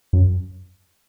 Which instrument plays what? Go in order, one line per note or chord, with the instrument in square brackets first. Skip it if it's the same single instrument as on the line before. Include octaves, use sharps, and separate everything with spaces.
[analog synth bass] F#2